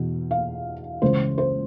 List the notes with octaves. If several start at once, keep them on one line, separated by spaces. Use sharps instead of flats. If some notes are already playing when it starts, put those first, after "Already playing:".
Already playing: E2 B2
F5
C#2 C#3 E3 C5
C5